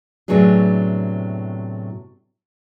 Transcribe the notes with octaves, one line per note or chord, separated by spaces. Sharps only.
A2 C3 F#3 B3 D4 G#4